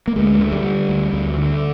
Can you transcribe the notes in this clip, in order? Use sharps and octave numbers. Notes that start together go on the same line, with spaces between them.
A#3
D2 G#3
D3
G3
D3
D2
D2
D3